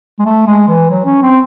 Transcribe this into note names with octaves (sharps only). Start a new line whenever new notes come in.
G#3
A3
G#3
E3
F#3
C#4
C4